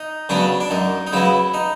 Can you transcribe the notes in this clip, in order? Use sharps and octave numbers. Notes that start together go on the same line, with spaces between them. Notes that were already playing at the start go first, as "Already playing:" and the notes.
Already playing: D#4
C#3 F#3 B3 D4
D4
F#2 D#4
D#4
C#3 F#3 B3 E4
D#4